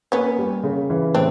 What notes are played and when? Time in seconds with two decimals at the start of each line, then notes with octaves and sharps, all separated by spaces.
0.12 A#3 B3 C#4
0.39 G3
0.63 C#3
0.90 E3
1.14 A2 C4 D4